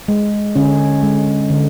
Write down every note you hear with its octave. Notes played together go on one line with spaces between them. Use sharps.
G#3
D3 C#4
G#3
D3